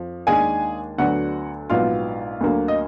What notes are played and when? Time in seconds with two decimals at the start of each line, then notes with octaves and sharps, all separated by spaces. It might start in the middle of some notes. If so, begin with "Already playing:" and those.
Already playing: F2 F3
0.27 D#2 D#3 G#3 D4 G#4 G#5
0.98 D2 D3 F#3 B3 D4 F#4 F#5
1.70 A#1 G#2 F#3 B3 F4 F5
2.41 D2 D3 F#3 A#3
2.68 D#5